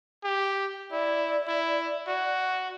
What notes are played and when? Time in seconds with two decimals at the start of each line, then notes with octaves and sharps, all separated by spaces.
0.24 G4
0.92 E4 D5
1.48 E4
2.08 F#4